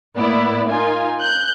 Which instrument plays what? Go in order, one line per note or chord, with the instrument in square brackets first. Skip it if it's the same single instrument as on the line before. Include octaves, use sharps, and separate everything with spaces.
[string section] A2 A#3 B3 E4 D5
D#4 F4 A#4 G#5
F#6 G6